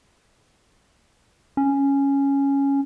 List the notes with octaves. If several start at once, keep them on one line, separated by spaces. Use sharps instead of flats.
C#4